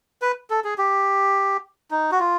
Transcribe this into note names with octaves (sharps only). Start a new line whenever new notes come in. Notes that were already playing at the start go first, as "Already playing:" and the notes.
B4
A4
G#4
G4
D#4
F#4
F4